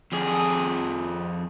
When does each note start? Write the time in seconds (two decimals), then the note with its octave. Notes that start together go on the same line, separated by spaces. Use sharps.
0.12 F2 G#4